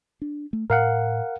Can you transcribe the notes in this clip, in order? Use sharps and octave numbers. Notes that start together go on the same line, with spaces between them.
D4
A3
A2 A#4 F5 F#5